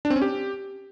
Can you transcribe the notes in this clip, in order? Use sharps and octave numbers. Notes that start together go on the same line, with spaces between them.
D4
C4
C#4
G4